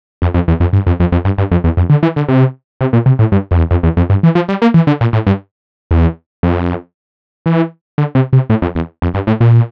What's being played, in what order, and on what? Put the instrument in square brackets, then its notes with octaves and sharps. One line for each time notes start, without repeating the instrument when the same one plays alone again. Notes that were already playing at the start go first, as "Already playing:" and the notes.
[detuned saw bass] F2
F2
E2
F2
G2
F2
F2
F2
G2
G2
F2
E2
F2
D3
E3
D3
C3
C3
A#2
C3
A2
G2
F2
E2
F2
E2
F2
G2
E3
F3
G3
A#3
E3
D3
A#2
A2
G2
E2
F2
E3
D3
C3
C3
A2
F2
E2
F2
G2
A2
A#2